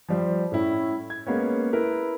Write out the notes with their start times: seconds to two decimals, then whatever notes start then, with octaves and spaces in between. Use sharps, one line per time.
0.09 F3 G3 C5
0.52 A2 C#4 E4
1.10 G#6
1.27 G#3 A#3 B3 C#4
1.73 E4 A#4 B4